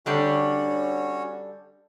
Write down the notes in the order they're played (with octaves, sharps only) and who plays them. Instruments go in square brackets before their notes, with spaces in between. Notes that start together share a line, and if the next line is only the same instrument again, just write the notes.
[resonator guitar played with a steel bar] D3 G3 D4 [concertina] C#4 F#4 C#5